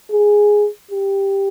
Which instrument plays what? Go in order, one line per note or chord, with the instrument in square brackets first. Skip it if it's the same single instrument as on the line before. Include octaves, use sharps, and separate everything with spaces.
[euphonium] G#4
G4